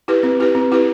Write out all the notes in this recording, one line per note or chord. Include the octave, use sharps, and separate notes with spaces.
E4 G4 B4
C4
E4 G4 B4
C4
E4 G4 B4